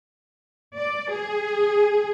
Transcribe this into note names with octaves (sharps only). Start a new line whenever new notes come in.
D5
G#4